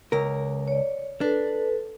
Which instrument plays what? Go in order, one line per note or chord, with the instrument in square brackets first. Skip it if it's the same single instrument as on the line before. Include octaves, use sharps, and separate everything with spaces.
[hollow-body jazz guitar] C#2 A#4
[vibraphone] C#5 D5
[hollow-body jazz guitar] D4 [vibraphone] A4 B4